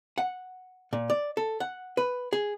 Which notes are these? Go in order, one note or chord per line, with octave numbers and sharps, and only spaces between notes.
F#5
A#2
D5
A4
F#5
B4
G#4